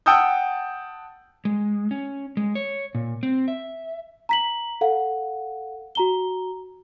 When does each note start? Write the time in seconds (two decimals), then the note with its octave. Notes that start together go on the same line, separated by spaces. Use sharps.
0.06 F#5 G5 A5 D#6 E6 G6
1.45 G#3
1.91 C#4
2.37 G#3
2.55 C#5
2.95 A#2
3.23 C4
3.48 E5
4.29 A#5 B6 F#7
4.81 A4 F5 F#5
5.95 F#4 A#5 G7